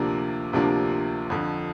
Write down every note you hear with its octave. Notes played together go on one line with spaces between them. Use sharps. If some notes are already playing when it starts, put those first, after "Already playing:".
Already playing: D2 C3 F3 A#3 D4
D2 C3 F3 A#3 D4
F2 D3 F3